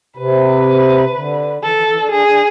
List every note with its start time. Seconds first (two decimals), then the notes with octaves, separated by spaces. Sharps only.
0.17 C3 B4
1.15 D3
1.63 E3 A4
1.75 E3
1.87 E3
1.99 D4
2.11 D4 G#4
2.27 D4